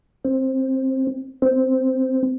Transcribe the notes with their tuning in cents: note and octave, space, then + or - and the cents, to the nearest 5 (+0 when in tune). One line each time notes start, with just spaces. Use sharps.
C4 +15
C4 -5